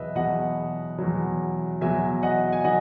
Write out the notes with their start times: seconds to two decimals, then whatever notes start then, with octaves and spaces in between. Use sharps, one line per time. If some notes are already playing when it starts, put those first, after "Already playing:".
Already playing: E2 B2 F#3 B4 D#5 E5
0.15 E2 B2 F#3 D#5 F#5
0.98 E2 B2 F#3
1.81 E2 B2 F#3 E5 G#5
2.23 D#5 F#5
2.53 G#5
2.64 D#3 F#3 D#5 F#5